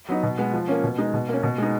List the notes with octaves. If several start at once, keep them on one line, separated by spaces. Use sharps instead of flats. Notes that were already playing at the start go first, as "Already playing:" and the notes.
F#3 B3 D#4
B2
G#3 B3
F3
A#3 C#4
B2
G#3 D#4
B2
A#3 C#4
B2
G#3 B3 D#4